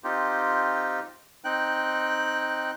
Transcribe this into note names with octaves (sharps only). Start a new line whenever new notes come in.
C4 D#4 F4 G4
C4 D#4 G5 F#6